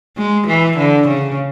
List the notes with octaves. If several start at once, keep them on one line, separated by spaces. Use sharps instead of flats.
G#3
E3
D3
C#3